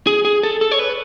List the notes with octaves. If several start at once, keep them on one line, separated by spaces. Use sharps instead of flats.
G#4
G#4
A4
A4
C#5
B4